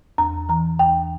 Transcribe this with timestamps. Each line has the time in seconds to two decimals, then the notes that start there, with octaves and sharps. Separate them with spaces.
0.18 E2 A#5
0.49 E3 A#5
0.79 E2 G5